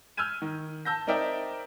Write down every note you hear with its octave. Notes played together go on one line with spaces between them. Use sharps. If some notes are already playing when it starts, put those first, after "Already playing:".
E6 F6 G6 G#6 D#7
D#3
A5 E6 G6 A#6
C4 D#4 A#4 D5 E5 G5